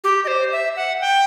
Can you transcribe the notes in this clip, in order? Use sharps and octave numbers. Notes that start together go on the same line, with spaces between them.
G4
D#5
C5
E5
F#5
G5